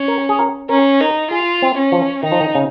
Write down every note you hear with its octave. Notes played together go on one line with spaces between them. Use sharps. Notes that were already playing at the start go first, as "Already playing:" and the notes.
Already playing: C#4
A#4
G#4
A#4
C#4 A#4
D#4 A#4
F4 G#4
C4
C#4
F3
D#3 D#4
F3
D#3
C#3